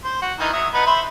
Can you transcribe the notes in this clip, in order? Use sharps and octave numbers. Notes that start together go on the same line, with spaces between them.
C5
F#4
D#3 E3 D#4
F#3 E5 D#6
B3 D#4 B4
C5 E5 B5